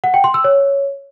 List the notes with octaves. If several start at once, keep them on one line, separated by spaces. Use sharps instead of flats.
F#5
G5
C6
E6
C#5